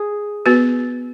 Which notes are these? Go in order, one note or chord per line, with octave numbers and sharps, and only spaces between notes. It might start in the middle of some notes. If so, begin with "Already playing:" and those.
Already playing: G#4
B3 F#4 B4